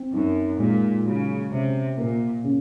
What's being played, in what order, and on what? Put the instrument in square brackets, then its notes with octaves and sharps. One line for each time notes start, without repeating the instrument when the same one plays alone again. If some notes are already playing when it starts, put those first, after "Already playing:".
Already playing: [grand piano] C4
[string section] F#2 [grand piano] D#4
[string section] A#2 [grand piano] G#3
[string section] C#3 [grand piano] F#3
[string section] C3 [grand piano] C#4
[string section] A#2 [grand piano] A#3
[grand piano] C#3